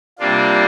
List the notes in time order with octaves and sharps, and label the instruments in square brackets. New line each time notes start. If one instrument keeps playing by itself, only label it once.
[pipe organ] C3 G3 A#3 D4 F4